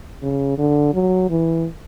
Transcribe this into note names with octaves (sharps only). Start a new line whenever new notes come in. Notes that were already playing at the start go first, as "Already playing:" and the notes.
C#3
D3
F#3
E3